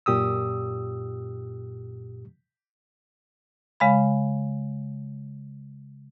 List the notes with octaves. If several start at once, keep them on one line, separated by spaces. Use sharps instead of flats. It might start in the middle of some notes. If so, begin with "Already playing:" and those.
F#2 A#2 G4 D#6 E6
C#3 G#3 F5 B5